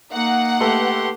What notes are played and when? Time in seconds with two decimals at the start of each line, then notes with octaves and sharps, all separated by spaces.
0.12 A#3 D#4 F#5
0.60 A3 G4 A4 B4 C6